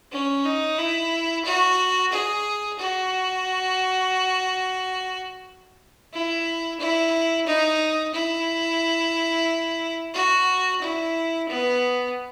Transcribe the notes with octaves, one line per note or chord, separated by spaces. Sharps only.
C#4
D#4
E4
F#4
G#4
F#4
E4
E4
D#4
E4
F#4
E4
B3